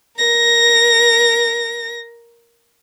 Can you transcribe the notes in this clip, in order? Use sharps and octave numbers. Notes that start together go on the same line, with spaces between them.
A#4 A#6